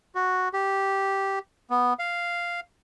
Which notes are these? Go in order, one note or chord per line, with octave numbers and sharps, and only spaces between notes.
F#4
G4
B3
F5